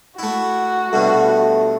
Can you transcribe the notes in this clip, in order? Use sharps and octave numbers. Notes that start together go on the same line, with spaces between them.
A3 E4 F#4
G2 B2 A3